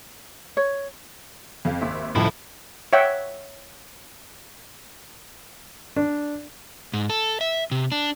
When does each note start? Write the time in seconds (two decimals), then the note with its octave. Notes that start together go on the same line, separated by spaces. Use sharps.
0.57 C#5
1.65 F2 F5
1.81 G#1 D#2 E5
2.16 C#2 A2 F3 E4
2.93 C#5 E5 F#5 G5
5.96 D4
6.93 G#2
7.10 A4
7.41 E5
7.71 C3
7.92 D4